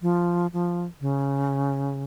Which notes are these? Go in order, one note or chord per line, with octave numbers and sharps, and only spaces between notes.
F3
F3
C#3